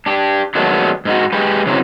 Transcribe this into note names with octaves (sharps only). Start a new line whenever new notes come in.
D4 G4
D#3 F#3 G#3 A3 B3 D4
G#2 D#4 F#4
G#3 G4 B4
C#3 E3 F#3 B3 C4 E4